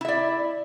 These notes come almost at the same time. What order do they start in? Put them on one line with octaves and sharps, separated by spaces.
E4 E5 D5